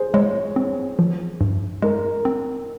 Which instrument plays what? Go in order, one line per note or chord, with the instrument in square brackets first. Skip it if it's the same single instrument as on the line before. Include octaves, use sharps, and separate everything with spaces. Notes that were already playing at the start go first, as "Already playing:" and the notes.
Already playing: [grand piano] G#4 C5
[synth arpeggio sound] G#3 [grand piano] C#5
[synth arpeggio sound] C4
F3
G2
[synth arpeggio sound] G#3 [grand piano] A#4
[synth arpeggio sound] C4